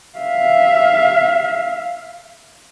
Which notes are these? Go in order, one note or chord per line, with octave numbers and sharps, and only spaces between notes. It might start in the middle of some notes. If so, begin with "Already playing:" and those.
E5 F5